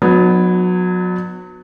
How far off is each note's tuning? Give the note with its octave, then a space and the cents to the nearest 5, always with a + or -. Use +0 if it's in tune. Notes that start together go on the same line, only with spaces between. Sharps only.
F#3 -30 B3 +0 D4 +40